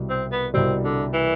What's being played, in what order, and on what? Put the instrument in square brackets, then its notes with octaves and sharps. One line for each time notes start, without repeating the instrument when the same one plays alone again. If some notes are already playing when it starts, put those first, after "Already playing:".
Already playing: [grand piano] C2 B2 G3
[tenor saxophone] C4
B3
[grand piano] C2 B2 G3 [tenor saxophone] C4
[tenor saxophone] D3
E3